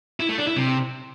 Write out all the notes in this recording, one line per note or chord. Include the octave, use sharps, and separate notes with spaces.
E4
A3
D4
E4
C3